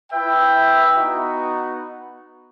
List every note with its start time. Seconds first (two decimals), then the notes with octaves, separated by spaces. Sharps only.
0.12 E4 B4 E5 G5
0.96 B3 D#4 F#4